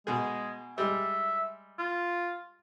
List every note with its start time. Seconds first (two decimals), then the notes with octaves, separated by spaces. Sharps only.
0.07 B2 G#3 G#4
0.78 G3 G#3 E5
1.79 F4